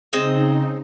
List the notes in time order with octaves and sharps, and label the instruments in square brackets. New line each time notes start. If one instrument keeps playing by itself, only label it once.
[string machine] C#3 D#4 [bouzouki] G#3 C4 D#5